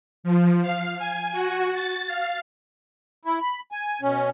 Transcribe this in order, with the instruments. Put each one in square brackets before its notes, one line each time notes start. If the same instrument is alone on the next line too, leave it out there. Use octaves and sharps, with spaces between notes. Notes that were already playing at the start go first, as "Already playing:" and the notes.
[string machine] F3
F5
G#5
F#4
A6
F5
[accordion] E4
B5
G#5
B2 C#4